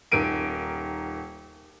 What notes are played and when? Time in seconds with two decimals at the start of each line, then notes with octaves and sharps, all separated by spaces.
0.12 D#1 D#3 A#4 D7 D#7